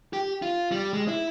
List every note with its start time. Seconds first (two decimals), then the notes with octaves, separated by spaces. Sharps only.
0.13 G4
0.42 F4
0.72 G3
0.93 G#3
1.08 E4